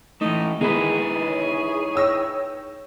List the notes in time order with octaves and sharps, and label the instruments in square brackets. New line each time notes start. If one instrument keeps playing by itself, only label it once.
[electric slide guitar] E3 A3 [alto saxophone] D#4
[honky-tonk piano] D#3 G#3 B3 [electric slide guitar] D#4 E4 B4 [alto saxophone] G#4
[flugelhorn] C#5
[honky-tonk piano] G5 E6 A#6